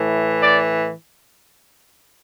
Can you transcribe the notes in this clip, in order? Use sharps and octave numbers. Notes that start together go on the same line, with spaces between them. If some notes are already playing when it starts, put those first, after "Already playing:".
Already playing: A2 E3
D5